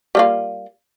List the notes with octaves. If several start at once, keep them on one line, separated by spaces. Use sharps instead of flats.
G3 A#3 F4